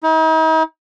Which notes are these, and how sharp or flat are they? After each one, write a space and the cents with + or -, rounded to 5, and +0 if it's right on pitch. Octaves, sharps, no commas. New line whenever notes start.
D#4 +45